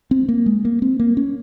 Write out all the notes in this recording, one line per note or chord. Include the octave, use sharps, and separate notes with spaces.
C4
A#3
G#3
A#3
C4
A#3
C#4